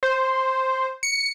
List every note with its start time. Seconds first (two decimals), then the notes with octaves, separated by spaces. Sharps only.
0.03 C5
1.03 C#7